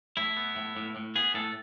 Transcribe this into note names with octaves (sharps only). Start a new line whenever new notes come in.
A2 E4
B3
A2
A2
A2
B3 G#4
A2 A4